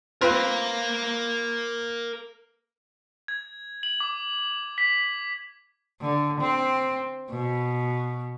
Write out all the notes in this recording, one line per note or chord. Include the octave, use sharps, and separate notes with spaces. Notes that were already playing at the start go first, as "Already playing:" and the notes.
C4 F4 A#4 B4 F5
G#6
F#7
D6
B6
D3
C4
B2